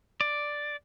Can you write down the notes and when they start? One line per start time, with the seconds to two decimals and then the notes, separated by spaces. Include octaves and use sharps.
0.21 D5